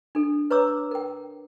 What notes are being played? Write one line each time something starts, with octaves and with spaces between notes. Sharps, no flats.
D4 A4
B4 C#5 A#5 D6 E6
A#4 G5